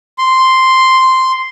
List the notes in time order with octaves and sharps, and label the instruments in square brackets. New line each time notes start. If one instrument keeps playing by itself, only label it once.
[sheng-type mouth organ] C6